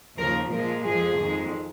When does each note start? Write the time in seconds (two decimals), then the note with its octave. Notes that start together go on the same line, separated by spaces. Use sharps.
0.17 D#2 C#3 F3 A#4
0.51 A#2 F3 G#3 A#4
0.85 F2 F3 G#3 G#4
1.19 F2 D#3 G#3